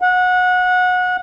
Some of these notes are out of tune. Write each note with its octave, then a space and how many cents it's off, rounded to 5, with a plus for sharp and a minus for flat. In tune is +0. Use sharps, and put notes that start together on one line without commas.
F#5 -25